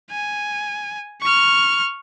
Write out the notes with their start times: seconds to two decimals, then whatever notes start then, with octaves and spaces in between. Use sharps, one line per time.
0.11 G#5
1.22 C#6 F6